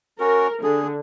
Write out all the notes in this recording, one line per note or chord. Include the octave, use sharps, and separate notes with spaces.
C#4 F#4 A#4
D3 G#4